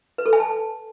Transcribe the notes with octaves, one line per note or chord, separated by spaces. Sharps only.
B4
A4
G#5
A5